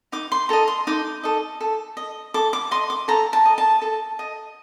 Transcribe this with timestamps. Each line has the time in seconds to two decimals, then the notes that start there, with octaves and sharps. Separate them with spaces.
0.12 D#4 D6
0.32 C6
0.49 A4 D#5 A#5
0.68 C6
0.87 D#4 D6
1.23 A4 D#5
1.61 A4
1.97 D#5
2.34 A4 D6
2.53 D6
2.71 D#5 C6
2.90 D6
3.08 A4 A#5
3.33 A5
3.45 D#5
3.58 A5
3.82 A4
4.19 D#5